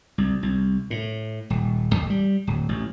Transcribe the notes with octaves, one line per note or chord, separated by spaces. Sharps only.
C2
C2
A2
D#1
A1
G3
D1
A1